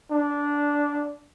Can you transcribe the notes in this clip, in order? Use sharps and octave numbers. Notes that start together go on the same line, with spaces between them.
D4